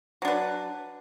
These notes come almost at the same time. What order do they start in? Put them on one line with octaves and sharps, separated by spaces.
F#3 D4 B4